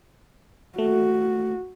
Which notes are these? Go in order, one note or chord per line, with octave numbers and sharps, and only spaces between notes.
A3 F#4